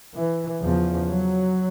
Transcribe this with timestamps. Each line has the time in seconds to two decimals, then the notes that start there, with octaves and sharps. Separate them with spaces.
0.15 E3
0.61 E2 C#3 F3
1.09 F#3